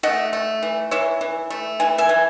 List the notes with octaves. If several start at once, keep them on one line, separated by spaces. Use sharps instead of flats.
A3 D#5 F#5
A3
E3
E3 C#5 E5
E3
A3
E3 G#5
E5 G#5
E3